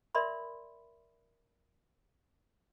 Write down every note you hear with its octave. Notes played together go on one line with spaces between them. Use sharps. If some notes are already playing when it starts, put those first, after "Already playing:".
A#4 D5 E5 B5 C6